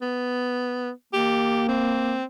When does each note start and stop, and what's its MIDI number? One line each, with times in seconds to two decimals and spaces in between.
0.02 0.91 59
1.13 2.20 58
1.13 1.68 67
1.68 2.24 60